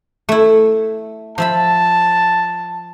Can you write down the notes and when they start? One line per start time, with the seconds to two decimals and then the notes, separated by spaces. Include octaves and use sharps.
0.29 A3 E4
1.38 F3 E5 A5 B5